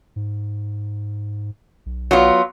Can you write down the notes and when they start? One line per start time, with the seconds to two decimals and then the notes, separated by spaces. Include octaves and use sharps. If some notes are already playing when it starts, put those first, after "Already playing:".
0.16 G#2
1.86 B1
2.11 F#3 B3 F4